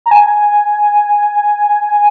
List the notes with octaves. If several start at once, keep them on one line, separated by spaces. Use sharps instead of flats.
A#5
G#5
G#5